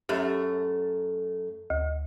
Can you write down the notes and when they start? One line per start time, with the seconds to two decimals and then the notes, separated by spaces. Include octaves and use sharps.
0.09 F#2 A3 G4
1.70 D2